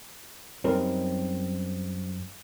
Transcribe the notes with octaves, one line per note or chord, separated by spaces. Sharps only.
F#2 G3 C4 D#4 A#4